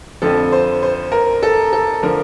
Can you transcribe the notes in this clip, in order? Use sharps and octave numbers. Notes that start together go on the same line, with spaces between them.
F2 D3 F3 A4
C5
C5
A#4
A4
A4
D3 F3 A#4